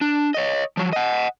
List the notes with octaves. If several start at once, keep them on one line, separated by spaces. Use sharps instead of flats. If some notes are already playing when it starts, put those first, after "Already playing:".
D4
C#5 D#5
F3 F#3
D#5 F#5